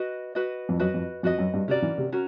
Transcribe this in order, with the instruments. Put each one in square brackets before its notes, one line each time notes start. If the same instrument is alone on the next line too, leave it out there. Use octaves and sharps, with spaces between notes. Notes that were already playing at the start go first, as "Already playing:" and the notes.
Already playing: [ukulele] F#4 B4 D#5
F#4 B4 D#5
[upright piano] F2
[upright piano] F#2 [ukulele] F#4 B4 D#5
[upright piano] F2
[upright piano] F2 [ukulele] F#4 B4 D#5
[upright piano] F#2
G2
[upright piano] C3 [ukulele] C#4 F#4 A#4 D5
[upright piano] E3
C3
[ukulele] C#4 F#4 A#4